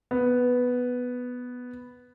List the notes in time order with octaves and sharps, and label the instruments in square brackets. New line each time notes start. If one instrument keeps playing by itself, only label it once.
[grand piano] B3